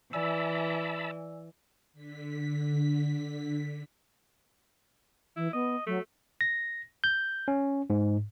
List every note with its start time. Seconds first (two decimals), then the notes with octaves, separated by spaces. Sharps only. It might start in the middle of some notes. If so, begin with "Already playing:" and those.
0.13 E3 D5 E5 G#5 A5 B5 E6
1.93 D3 B6
5.36 E3 E4
5.53 B3 D#5
5.87 F#3 A3
6.41 A#6
7.04 G6
7.48 C#4
7.90 G#2